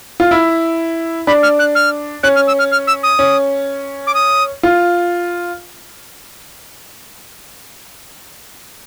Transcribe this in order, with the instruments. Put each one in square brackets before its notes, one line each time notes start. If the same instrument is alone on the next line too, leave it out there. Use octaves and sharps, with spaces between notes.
[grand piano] F4
E4
[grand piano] D4 [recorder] B5
[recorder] F6
F#6
F6
[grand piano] C#4 [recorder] F#6
[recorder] F6
E6
F6
F6
E6
D#6
[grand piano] C#4
[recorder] D6
D#6
[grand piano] F4